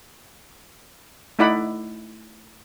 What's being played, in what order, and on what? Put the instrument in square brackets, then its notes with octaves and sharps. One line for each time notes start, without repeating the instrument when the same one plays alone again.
[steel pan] A3 D#4 E4 D5 F#5 B5